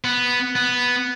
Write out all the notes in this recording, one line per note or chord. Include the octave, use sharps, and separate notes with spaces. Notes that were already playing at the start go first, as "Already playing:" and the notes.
B3
B3